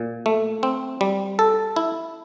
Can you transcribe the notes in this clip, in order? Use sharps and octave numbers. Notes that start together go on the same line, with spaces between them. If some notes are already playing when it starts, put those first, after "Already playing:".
Already playing: A#2
A3
C4
G3
A4
E4